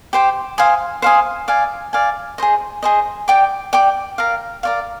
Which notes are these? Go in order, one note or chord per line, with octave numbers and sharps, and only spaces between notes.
G4 C5 G5
C5 F5 G#5 D#6
C5 F5 G#5 D#6
D5 F5 G#5
D5 F5 G#5
G#4 C5 D#5
G#4 C5 D#5
D5 G5 D6
D5 G5 D6
A#4 D5 F5
A#4 D5 F5